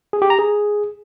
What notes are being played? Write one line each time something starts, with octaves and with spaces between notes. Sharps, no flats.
G#4
G4
A#5
G#4